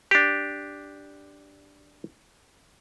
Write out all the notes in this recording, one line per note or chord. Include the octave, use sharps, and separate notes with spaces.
D4 G4